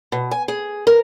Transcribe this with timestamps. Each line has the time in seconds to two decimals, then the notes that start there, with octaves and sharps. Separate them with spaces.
0.12 B2
0.31 G#5
0.48 G#4
0.87 A#4